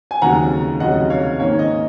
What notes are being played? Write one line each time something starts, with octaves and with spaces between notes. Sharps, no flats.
G#5
F1 D#2 C#3 F#3 F#5 A#5
F1 D#2 C#3 F#3 D#5 F#5
C#5 F5
G#2 D#3 A#3 C#4 C#5
D#5